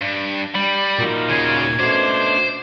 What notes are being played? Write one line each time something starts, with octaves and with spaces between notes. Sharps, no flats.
G2
G3 B5
A#2 D#4 F4 F#4 A#4
C#3 G#4 G#6
B2 A3 C#4 D4 F#4 C5